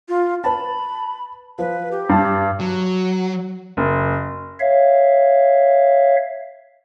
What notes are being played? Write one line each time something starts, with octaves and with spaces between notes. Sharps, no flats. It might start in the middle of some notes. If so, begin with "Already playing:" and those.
F4
B4 A5 B5
F3 B4
G4
G2 A5
F#3
F#1
C#5 E5 F5